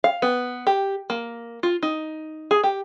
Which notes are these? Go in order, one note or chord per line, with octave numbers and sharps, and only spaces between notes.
F5
B3
G4
A#3
F4
D#4
G#4
G4